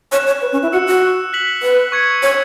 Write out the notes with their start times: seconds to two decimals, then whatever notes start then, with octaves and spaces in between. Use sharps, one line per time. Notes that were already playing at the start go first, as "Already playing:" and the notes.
0.12 C#5 F#6 E7
0.27 C#5
0.42 B4
0.52 C#4
0.63 E4
0.72 F#4 E6 C#7 E7
0.87 F#4
1.33 F#6 B6 F#7
1.62 B4
1.92 C#6 G#6 C#7
2.23 C#5